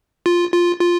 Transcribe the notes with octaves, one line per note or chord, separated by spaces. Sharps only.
F4
F4
F4